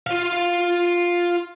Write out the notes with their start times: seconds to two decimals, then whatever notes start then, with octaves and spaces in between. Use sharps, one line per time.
0.07 F4 F5